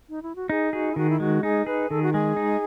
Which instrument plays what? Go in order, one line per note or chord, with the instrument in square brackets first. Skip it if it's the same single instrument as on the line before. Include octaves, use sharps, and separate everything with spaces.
[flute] D#4
E4
F#4
[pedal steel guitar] D#4 [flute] G#4
[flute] F#4 [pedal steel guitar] G#4
[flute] E4
[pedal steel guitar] D#3 [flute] F#4
[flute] E4
[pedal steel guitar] G#3 [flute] F#4
[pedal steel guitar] D#4 [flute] G#4
[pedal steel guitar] G#4 [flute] B4
[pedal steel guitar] D#3 [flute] A4
[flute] F#4
[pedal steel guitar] G#3 [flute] G#4
[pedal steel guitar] D#4